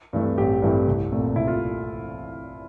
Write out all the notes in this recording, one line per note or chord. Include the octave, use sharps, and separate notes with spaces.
G2 E3 A3 C4
A1 G4
G2 E3 A3 C4
C2
A#2 A3 C4
C2 E4
F4